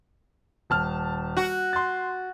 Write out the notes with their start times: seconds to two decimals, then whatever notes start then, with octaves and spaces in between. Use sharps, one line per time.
0.70 D#1 A5 F6
1.37 F#4
1.73 C6 A6